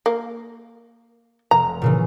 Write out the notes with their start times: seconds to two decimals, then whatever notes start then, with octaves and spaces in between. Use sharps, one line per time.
0.06 A#3
1.51 F1 A#5
1.82 A#2 C#3 E3